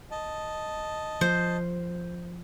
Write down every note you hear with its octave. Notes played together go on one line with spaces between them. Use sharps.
D#5 A5
F3 C5